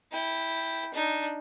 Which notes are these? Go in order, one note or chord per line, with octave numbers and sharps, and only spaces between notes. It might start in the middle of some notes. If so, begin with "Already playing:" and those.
E4 G5
D4 D#4